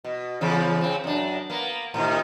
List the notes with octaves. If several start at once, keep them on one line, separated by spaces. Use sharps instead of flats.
B2
E2 C#3 F3
C#3 C4
F#2 D4
A#3 B3
A2 C3 D#3